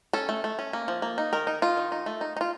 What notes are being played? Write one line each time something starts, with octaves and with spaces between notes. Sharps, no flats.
C#4 A4
A3
A3
C#4
A#3
F3
A#3
D#4
D#3 A#4
D#4
D#4 F4
D#3
D#4
A3
D#4
D#4
F4